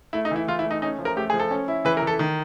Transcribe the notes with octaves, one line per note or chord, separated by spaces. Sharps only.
A3 E4
D#4
E3 E4
E3 F4
E4
A3
D#4
C#4 D#4
F3
A#4
A3 G4
F3 G#4
A4
C#4
E4
E3 B4
A#4
E3 A4
D#3